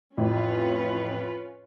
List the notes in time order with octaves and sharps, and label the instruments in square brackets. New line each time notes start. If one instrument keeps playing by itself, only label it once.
[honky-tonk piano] A1 F2 A2 [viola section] C#4 F4 B4